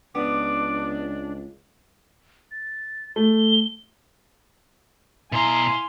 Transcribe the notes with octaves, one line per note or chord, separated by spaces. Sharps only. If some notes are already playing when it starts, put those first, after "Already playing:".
C#2 B3 D4 D6
A6
A3 G7
B2 E4 F5 G#5 A#5 C6